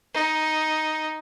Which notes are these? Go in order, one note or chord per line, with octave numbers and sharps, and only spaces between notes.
D#4